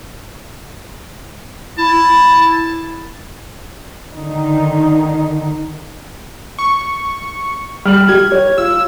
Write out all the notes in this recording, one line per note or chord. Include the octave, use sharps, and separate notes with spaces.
E4 A5
D3 D#3 D#4
C#6
G3 F6 F#7
G4 G#6
C#5
F4 E6